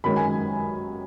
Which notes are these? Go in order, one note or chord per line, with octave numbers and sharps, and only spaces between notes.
F#2 D#3 G#3 C#4 B5
G#5